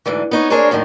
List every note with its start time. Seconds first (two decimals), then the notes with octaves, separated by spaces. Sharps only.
0.06 D2 G#2 D3 E3
0.31 B3 D#4 C#5
0.50 D4 G#4 A#4 C5 C#5
0.71 F#2 A2 D3 D#3